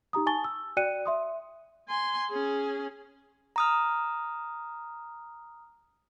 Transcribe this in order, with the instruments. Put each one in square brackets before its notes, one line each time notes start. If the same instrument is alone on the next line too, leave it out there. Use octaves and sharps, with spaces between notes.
[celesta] D#4 G4 A#5 D#6
G#5 A5 C#6 A6 G7
E6
F#4 D5 G5 F#6 C#7 D#7
E5 C6 D#6
[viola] G#5 C6
C#4 G#4
[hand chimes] A#5 D#6 F6